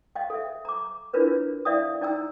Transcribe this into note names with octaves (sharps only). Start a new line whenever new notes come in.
D#5 F5 G5
A4 E5
A#5 D6
D4 E4 F4 A#4 B4 C#5
E4 D5 E5 F5 G5 D#6
D#4 D5 G5 A#5 E6